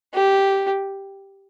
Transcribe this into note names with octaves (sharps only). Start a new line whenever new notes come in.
G4